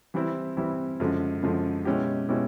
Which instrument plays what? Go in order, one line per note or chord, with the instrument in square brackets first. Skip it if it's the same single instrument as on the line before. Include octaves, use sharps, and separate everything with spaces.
[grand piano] E3 G3 C4 E4
E3 G3 C4 E4
F#2 D3 F3 G#3
F#2 D3 F3 G#3
B2 G#3 C#4 E4 G4
B2 G#3 C#4 E4 G4